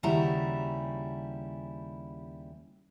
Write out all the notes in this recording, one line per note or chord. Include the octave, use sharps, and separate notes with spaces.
D#2 C#3 G3 E4 F#4 A#5